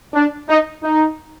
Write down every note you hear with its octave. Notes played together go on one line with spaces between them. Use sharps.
D4
D#4
D#4